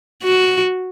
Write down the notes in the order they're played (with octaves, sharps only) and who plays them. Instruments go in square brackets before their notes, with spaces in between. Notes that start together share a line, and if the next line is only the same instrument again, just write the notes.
[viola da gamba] F#4